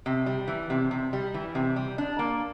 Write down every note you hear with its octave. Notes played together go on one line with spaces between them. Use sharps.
C3
G3
E3
C3
C3
G3
E3
C3
G3
D4
A#3